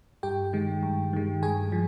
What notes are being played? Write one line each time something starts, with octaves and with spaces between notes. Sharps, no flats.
G2 G4 G5
D#3 G#3
G2
D#3 G#3
G2 G#4 G#5
F3